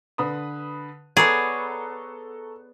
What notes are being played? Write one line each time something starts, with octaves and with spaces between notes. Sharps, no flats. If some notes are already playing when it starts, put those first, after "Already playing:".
D3 B4 D#6
B3 G#4 A4 C#5 D5 A#5 C#6